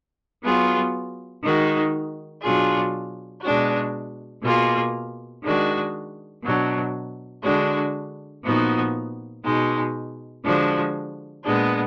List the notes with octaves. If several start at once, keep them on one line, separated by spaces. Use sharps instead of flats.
F#3 B3 F4 G#4
D#3 G#3 D#4 F#4
B2 F#3 D4 F4 G#4
B2 G#3 D4 F#4
B2 A#3 F4 G#4
D#3 G#3 D4 F#4
B2 F#3 D4
D3 G#3 D4 F#4
A#2 F3 B3 D#4 F#4
B2 G#3 D#4
D3 F3 G#3 D4 F#4
A#2 G#3 B3 D4